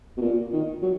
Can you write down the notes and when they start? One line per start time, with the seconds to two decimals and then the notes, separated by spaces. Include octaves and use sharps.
0.17 B2
0.21 A#2
0.52 D#3
0.82 F#3